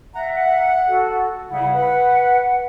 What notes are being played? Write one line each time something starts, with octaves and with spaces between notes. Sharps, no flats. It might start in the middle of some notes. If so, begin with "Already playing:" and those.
E5 F#5 A#5
F#5
F#4 A4
C#3 G3 E4 F#5
B4